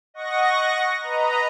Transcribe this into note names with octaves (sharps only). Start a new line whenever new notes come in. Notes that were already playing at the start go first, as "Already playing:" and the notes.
D#5 F#5 C#6 A#6
B4 D#5 A#5